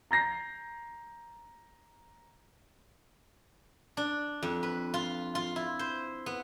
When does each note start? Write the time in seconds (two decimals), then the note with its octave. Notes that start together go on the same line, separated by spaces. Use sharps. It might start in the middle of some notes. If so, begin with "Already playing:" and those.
0.11 A#5 G6 A#6 C7
3.97 D4
4.43 F2
4.63 B4
4.94 F4
5.35 F4
5.56 E4
5.79 C5
6.26 B3